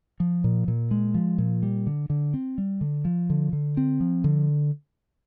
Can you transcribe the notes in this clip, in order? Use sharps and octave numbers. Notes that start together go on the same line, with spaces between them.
F3
A#2
A#2
G#3
F3
A#2
G3
D3
D3
C4
G3
D3
F3
D3
D3
C4
F3
D3